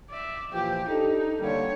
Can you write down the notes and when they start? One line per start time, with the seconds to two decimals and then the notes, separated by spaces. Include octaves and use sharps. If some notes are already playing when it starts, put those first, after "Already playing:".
0.10 D5 E5
0.53 A#2 E3 F3 G4
0.88 D4 D#4 G4 A4
1.41 D3 G3 A#3 C#5